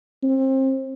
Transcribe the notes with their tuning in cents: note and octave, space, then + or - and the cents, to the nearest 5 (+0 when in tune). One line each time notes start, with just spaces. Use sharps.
C4 +30